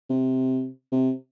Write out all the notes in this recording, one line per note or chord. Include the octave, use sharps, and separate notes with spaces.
C3
C3